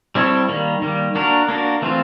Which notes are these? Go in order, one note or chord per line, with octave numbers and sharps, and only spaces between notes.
G3 C4 E4 A4 C#5
D#3 G3 A#3
D#3 G3 A#3
A#3 D4 F#4 A#4
A#3 D4 F#4 A#4
E3 A3 C4 F4